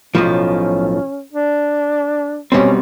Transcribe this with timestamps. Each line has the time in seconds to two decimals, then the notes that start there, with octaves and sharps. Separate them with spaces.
0.14 B1 A2 F3 C#4
1.33 D4
2.52 B1 B2 G3 C4 C#4